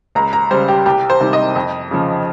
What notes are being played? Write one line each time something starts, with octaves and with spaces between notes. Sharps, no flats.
C#2 A#5
A#5
C#3 G3 C5
G4
C2 G4
C5
C3 D#3 G3
D#5
F2
C#3 F3